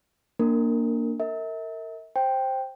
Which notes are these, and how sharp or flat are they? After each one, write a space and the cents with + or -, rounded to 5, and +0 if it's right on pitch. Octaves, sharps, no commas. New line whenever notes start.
A#3 +0 D4 +0 A#4 -20
A#4 -30 E5 -40
C5 +10 G5 +0